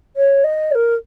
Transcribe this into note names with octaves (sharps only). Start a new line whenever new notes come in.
C#5
D#5
C#5
A#4